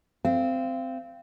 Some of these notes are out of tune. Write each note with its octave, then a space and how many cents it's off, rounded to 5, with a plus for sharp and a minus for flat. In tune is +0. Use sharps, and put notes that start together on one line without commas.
C4 -15 F5 -30